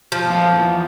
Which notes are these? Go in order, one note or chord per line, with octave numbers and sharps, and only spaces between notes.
F3
F2 A#2 F5
E2